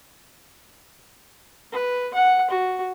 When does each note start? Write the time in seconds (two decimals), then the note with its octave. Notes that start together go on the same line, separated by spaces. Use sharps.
1.72 B4
2.14 F#5
2.50 F#4